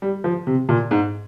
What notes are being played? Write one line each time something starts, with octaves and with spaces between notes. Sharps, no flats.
G3
F3
C3
A#2
G#2